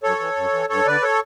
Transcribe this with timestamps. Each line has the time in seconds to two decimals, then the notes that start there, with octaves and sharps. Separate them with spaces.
0.03 F#2 A4 C#5
0.20 E3
0.36 F#2
0.53 E3
0.69 G2 A4 C#5
0.86 D3 B4 D5
1.02 A4 C#5